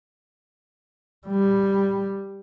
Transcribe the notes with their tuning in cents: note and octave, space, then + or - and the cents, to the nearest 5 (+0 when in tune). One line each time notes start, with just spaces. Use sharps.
G3 +5